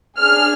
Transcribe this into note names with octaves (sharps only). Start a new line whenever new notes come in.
D4 G#4 F6